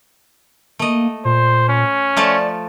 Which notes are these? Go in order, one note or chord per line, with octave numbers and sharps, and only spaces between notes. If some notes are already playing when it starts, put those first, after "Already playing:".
A3 A#3 D#5
A#2 C5
C#4
F3 A3 D5 A5